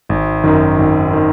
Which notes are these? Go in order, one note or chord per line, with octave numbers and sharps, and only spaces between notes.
G#1
F#2 D#3
G#1
D#3